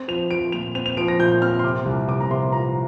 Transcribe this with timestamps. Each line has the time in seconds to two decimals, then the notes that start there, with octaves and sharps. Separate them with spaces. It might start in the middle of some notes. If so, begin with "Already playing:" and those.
Already playing: C4
0.08 F3 F7
0.31 F3 D7
0.52 A#2 F7
0.75 C4 F7
0.86 F7
0.97 F3 D7
1.08 A#6
1.19 A#2 G6
1.42 C4 F6
1.59 C6
1.64 C3 D6
1.86 C2
2.08 C3 D6
2.21 A#5
2.30 C3 C6
2.52 F3 A#5